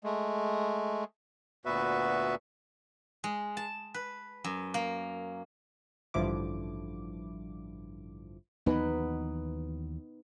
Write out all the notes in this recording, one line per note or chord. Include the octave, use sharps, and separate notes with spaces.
G#3 A3
D2 A#2 B3 F#4 B4 E5
G#3
A5
B4
F#2
A#3
A1 G2 D3 F3 E4 D6
D#2 E3 F#3 B3 D#4 B4